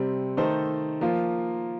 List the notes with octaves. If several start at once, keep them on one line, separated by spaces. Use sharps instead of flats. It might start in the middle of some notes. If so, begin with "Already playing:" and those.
Already playing: C3 G3 C4
D#3 A3 D#4 A4 C5
F3 A#3 F4